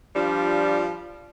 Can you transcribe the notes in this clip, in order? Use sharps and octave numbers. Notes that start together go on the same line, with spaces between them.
F3 G3 D4 F4